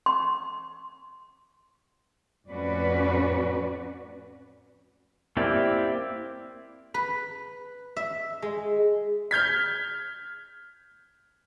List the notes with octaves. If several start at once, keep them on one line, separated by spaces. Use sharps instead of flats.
C6
F2 A2 C#4 F#4 B4 D5
A#3 C4 E4 G4 D5
B4
E5
G#3
F6 G6 G#6 B6